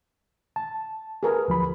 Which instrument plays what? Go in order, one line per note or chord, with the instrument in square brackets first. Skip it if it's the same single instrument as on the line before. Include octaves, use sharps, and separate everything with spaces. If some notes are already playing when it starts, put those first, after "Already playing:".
[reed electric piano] A5
[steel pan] G#4 A#4 B4
[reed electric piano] D2 F3 B5